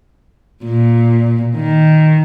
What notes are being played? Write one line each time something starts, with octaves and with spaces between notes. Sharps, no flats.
A#2
D#3